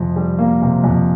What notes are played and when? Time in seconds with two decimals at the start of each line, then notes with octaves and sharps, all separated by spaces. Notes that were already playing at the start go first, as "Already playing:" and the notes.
Already playing: F2 C3
0.16 G3
0.39 A#3
0.62 C3
0.84 F2